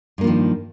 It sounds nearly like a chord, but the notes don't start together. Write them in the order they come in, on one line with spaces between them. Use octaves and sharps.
G2 A#3 F3 D#3